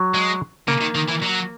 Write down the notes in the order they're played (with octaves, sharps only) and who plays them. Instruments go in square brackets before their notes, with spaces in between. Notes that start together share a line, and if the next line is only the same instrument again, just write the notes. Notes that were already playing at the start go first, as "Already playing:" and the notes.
Already playing: [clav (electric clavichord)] F#3
[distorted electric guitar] G#3
[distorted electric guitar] C#3 [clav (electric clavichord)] A#3
[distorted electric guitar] D#3
D#3
E3
F#3